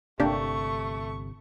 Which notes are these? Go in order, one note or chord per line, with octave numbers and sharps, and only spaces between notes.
G1 C3 A3 A#3 D4 G4 C#6